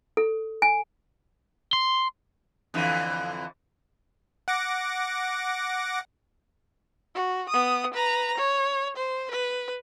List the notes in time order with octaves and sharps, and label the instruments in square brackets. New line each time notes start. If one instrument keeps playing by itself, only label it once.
[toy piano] A4
G#5
[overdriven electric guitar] C6
[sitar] F2 D3 E3
[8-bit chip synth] F#5 D6 A#6
[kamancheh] F#4
B3 D#6
B4 A#5
C#5
C5
B4